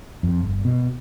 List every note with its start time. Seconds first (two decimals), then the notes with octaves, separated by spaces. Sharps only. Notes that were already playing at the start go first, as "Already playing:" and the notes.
0.23 F2
0.43 G1
0.65 B2